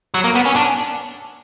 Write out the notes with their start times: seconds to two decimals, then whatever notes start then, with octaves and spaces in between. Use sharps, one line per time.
0.14 F#3
0.24 A#3
0.35 B3
0.46 C#4
0.56 D4